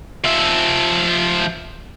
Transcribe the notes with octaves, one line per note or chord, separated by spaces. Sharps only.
F3 E5